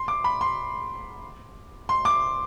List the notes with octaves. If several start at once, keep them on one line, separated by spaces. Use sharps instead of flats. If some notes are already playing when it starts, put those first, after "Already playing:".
Already playing: C6
D6
B5
C6
C6
D6